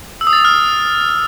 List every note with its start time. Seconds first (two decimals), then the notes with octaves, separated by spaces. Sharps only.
0.21 E6
0.27 D#6
0.33 A6
0.39 E6
0.45 F6